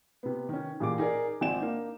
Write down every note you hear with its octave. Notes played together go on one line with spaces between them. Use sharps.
C3 B3
D#3 C#4
A1 A#2 G4 G#4 D6
D#4 G#4 A#4 D5
G#1 C4 F4 D5 G#5 E7
A#3 D4 D#4